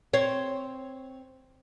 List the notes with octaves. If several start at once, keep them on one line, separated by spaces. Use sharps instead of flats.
C4 C#5